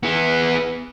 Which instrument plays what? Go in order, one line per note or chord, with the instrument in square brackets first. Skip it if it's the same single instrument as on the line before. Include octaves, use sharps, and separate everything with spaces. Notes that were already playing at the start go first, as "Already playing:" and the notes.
[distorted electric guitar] E3 B3